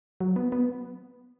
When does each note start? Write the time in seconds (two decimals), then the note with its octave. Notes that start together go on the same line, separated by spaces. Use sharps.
0.20 F#3
0.36 B3
0.52 B3